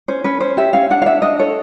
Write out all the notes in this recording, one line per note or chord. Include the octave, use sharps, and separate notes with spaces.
C#4 C5
C#4 B4
C#4 C5
G4 E5
C#4 F5
D4 F#5
F5
D4 E5
D4 D#5
A4 C#5